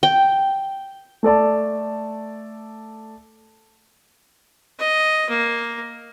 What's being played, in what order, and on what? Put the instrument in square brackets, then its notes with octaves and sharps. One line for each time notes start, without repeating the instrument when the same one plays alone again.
[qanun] G5
[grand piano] A3 A4 D5 A5
[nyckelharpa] D#5
A#3